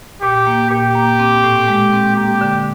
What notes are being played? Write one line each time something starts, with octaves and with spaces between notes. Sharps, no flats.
A#2 G4
A#3
A#2 G4
A#3
C4
A2
G#3
C4
A#3 G4
D3